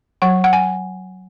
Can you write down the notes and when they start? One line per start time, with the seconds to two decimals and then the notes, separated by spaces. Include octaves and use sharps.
0.22 F#3 F#5
0.44 F#5
0.53 G#5